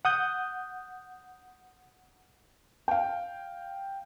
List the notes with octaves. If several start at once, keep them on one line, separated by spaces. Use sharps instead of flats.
F#5 D#6 G6
F5 G5